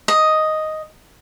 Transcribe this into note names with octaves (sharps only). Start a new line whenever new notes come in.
D#5